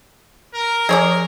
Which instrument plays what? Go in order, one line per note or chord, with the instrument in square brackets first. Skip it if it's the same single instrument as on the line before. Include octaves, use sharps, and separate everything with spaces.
[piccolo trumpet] A#4
[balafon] F3 [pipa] G#4 C#5 D5 [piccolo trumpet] A#4